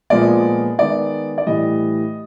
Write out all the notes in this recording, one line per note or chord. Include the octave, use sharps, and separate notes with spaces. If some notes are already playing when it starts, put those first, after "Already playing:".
A#2 F3 G#3 B3 D5
D#3 G#3 B3 D5
D5
A2 E3 G3 D#5